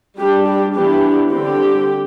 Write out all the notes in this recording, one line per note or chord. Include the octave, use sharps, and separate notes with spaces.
G3 D4 G4
G4
E3 B3 D4 G4
D3 G3 C4 G4